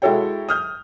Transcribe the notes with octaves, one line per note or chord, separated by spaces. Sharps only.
G#3 E4 F#4 A4 C#5 G5
D#6 F6 G6